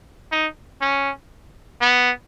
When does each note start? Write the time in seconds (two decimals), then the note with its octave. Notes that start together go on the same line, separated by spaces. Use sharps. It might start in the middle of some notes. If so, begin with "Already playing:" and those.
0.32 D#4
0.81 C#4
1.81 B3